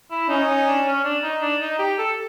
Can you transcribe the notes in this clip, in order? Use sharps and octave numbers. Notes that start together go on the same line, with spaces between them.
E4
C#4 D#4
D#4
D4
C#4
D4
D#4
D4
D#4
G4
A4